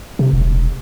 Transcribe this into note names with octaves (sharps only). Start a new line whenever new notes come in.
C3
E1